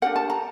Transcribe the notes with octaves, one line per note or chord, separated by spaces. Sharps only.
D4 G4 A#4 F#5
A5
A#5